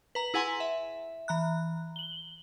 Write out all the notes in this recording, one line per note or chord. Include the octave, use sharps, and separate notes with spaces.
B4 A#5
E4 G#4 F#5 G#5 A#5 C6
E5
E3 A#5 F#6
F#7 G7